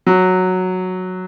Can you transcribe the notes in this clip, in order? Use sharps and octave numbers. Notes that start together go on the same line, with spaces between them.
F#3